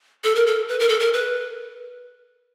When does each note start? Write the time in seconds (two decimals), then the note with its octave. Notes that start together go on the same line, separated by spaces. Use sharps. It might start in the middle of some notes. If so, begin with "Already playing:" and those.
0.24 A4
0.35 A#4
0.46 A4
0.69 B4
0.79 A#4
0.89 A4
1.00 A#4
1.13 B4